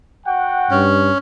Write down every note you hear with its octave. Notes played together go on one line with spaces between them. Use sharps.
F#4 F#5 G5
G2 C#4